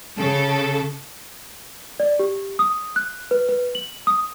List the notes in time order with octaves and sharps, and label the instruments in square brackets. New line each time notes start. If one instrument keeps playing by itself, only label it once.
[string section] C#3 A4
[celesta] D5
G4
D#6
F#6
B4
B4
F#7
D#6